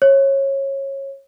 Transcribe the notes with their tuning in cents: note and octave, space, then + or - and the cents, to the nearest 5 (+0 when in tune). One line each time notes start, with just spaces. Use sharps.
C#5 -20